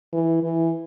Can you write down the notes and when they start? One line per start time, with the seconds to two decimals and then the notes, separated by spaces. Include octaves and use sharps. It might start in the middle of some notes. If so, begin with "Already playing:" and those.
0.13 E3
0.43 E3